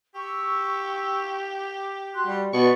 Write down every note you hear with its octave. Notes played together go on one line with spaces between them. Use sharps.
G4 C#6 E6
D6
F#4 C6 F#6
G3
B2 B4 D5 B5 C#6